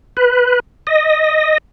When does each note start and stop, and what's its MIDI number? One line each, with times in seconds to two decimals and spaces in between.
0.17 0.60 71
0.87 1.58 75